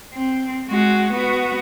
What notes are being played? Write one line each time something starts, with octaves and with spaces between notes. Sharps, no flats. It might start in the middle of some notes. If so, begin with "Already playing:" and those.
C4
G#3 F#4
B3 F#4